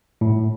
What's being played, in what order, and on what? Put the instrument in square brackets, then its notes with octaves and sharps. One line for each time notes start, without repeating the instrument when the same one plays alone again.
[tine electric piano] A2